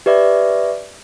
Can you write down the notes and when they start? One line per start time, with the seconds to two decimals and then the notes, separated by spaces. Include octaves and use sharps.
0.06 G4 B4 D5 E5